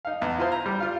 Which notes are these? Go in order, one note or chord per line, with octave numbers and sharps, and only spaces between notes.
D#4 F5
E2
E4 F4 C5
A#5
G3
F4 F5